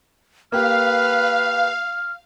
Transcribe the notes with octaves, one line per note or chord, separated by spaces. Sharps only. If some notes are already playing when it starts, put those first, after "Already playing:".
A#3 G4 B4 F5 F6